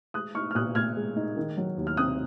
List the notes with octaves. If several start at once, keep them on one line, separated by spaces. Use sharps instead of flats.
G#3 D#6 F#6
D#4 C#6 F6
F6
A#2 D#6 F#6
A#2 F6 G#6
G#3
D#4
D#3
F#3
D#2
F6
C4 D#6 F#6